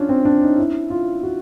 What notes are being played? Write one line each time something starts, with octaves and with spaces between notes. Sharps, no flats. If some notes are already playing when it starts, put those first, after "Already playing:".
Already playing: C#4 D4 F4
C4
D4
D#4
E4
F4
F#4